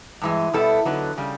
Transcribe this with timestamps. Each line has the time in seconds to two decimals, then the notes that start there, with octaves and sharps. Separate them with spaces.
0.22 G2 E3 G#3
0.53 B2 G3 B3 E4 A4
0.85 D3 F#3 B3 D#4
1.18 C#3 G3